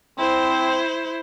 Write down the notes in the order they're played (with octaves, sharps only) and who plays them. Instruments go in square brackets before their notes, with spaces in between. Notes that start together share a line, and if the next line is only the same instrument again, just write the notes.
[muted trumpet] C4 [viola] E4 C5